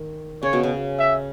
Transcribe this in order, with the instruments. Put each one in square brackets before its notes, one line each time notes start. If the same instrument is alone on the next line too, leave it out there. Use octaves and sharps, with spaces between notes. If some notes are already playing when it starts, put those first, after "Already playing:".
Already playing: [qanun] D#3
[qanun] C#3 [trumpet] C#5
[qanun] B2
C#3
[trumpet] E5